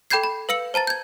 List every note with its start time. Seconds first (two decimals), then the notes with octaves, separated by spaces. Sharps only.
0.10 A4 G5 B5 G6 G#6 C7
0.24 B5
0.49 B4 F5 E6 C#7 F#7
0.74 C5 A5 A#5 A6
0.87 G6 G#6